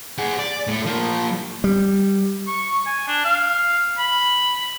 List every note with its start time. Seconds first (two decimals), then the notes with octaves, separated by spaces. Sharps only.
0.18 G#4 F#5
0.39 D5
0.67 A2 A3
0.85 F3 A#3
1.64 G3
2.47 C#6
2.86 G#5
3.08 D4
3.25 F5
3.98 B5